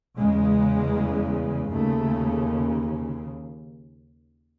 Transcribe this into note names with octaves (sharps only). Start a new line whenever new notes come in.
E2 C#3 G#3
D#2 C#3 A3